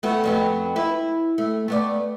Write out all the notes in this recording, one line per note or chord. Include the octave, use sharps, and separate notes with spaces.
A3 B3 F#4
F2 F#3 B3
E4 B4
A3
A3 B3 D5